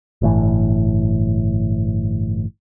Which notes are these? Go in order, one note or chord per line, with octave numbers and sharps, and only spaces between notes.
G1 A2 E3